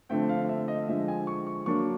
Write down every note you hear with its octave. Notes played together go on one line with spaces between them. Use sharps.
D3 F3 A3 C4 G5
F5
E5
D#5
D3 F3 G#3 E5
G#5
C#6
C#6
D3 F#3 A#3 D4 C#6